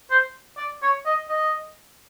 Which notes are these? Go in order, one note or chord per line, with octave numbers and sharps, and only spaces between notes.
C5
D5
C#5
D#5
D#5